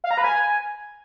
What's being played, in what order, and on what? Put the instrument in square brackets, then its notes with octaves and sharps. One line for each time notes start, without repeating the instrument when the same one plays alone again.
[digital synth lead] F5
A#5
B4
G#5